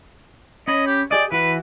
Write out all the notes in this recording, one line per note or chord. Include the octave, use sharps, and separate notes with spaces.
C#4 C#5 D#5 B5
G4
G4 G#4 D5 D#5
E3 F#4 B4